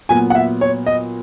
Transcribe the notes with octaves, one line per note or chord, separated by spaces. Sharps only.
A#2 F#3 B3 G#5
F#5
E5
C#5
D#5